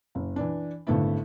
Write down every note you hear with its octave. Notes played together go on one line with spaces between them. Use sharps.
F#1
E3 D4
G#1 D3 A3 B3 E4